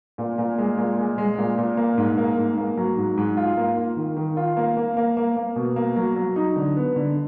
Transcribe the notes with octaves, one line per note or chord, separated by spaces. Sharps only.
A#2
A#2
G#3
A#2
G#3
G#3
A#2
A#2
A#3
G#2
A#3
G#2
A#3
F#3
G#2
G#2
F4
A#3
F4
D#3
D#3
F4
A#3
A#3
A#3
A#3
A#3
B2
A#3
F#3
F#3
D#4
D3
B3
D3